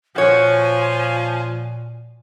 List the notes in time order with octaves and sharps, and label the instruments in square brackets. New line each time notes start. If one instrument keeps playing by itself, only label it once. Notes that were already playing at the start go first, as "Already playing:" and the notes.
[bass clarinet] A#2 [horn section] F3 [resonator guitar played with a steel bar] F#4 C#5 [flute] G#5